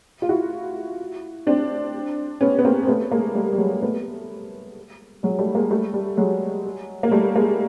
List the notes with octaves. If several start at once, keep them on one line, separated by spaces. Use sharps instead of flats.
F4
E4 F#4
C4 D4
B3 C#4
B3
A#3 C4
C4
A3 B3
G#3 A#3
G3 A3
G3
F#3 G#3
A3 B3
F#3 G#3
G3 A3
G#3 A#3
G3 A3
G3
F#3 G#3
A#3
G3 A3
G#3 A#3